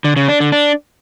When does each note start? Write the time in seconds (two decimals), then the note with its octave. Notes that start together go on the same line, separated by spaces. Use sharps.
0.04 D3
0.16 C#3
0.28 D4
0.40 D3
0.52 D4